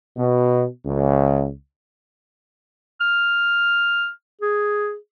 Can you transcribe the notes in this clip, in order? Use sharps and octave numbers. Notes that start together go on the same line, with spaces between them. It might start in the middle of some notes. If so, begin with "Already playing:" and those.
B2
C#2
F6
G#4